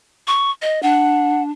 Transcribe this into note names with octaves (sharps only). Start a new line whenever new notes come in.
C#6
D#5
D4 F#5